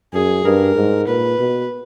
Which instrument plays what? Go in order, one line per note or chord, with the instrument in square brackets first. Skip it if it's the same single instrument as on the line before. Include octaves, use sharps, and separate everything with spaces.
[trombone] F#2 [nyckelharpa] G#4
[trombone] G2 [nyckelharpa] A#4
[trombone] G#2
[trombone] A#2 [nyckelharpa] B4
[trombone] B2